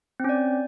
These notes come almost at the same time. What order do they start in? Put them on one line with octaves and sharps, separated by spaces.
C4 C#4 D5